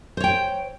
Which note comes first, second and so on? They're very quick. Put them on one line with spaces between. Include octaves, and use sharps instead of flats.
C5 C#5 G5